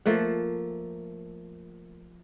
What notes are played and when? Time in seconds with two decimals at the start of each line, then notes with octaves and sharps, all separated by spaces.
0.06 F3 A3 A#3 F#5